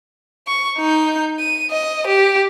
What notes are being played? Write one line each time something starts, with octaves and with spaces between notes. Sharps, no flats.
C#6
D#4 G6
D#7
D#5
G4